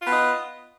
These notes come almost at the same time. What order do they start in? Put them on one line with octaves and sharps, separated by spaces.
F4 B3 D#5